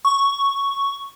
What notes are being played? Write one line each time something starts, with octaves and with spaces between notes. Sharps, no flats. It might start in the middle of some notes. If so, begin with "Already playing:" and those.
C#6